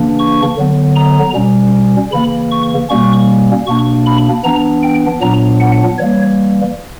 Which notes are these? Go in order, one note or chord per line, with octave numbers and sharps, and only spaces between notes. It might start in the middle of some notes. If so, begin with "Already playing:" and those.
Already playing: C#3 E3 A#3 D4
C#6
D3 F#3 B3
A#5
B2 G3 C#4
C#3 E3 A#3 B5
C#6
B2 G3 A#3 C#4 C#6
B2 A#3 D4 C#6
B5
E3 B3 D4 A#5
G5
A#2 F#3 B3 D4 A#5
F#5
E3 G3 A#3 C#5